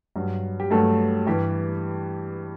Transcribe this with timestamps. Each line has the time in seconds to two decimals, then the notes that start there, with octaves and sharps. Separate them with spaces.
0.16 G2 F#3
0.60 G4
0.71 G2 F#3 A3 A4
1.27 G2 E3 G3 G4